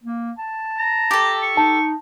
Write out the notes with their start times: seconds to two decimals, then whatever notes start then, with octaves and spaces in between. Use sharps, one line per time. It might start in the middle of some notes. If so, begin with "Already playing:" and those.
0.04 A#3
0.38 A5
0.79 A#5
1.11 G4 A4
1.42 C#6
1.57 D#4 A5